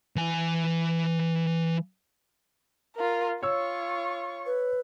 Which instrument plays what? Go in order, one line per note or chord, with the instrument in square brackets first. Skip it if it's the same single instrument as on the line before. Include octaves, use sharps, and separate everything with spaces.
[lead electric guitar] E3 G#5
[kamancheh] F4 A#4
[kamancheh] F4 C#6 [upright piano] C#5 E6
[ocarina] B4